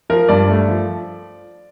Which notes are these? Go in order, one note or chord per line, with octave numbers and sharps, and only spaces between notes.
F3 A#4
G2 D5
A3
F3